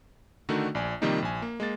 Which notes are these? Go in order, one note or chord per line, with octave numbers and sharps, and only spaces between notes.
D3 D#3 A3 D4 D#4 F#4
A#1 D5 G#5
C3 D#3 F3 G3 A#3 D#4
A#1 G#5
A#3
G#3 A#3 A6